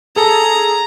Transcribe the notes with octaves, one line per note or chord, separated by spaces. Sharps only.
G#4 A4 A#5